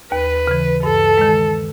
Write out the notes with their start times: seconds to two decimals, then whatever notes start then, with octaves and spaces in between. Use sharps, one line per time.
0.11 D#2 B4
0.47 C#3 E3
0.83 G2 A4
1.18 D#3 G#3